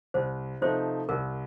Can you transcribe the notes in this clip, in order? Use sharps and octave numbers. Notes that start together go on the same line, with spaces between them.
C2 C5
C3 F3 A3 D#4 C5
C2 A#4